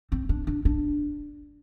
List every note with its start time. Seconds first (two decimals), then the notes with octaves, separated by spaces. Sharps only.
0.12 C4
0.29 D4
0.47 D4
0.65 D4